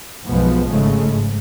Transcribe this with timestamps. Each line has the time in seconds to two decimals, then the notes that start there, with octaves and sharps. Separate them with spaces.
0.24 B1 F#2 B2 F3 G#3 B3
0.68 G#1 G#2 C#3 G#3 A3
1.08 G#2